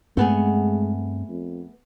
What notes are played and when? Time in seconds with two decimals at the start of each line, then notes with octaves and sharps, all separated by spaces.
0.17 G2 G#3 A3 B3 C4 G#4
1.29 F2